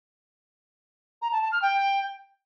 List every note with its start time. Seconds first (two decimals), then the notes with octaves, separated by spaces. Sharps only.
1.22 A#5
1.32 A5
1.42 A5
1.52 F6
1.62 G5